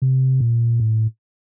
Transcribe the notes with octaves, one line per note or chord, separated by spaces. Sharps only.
C3
A#2
A2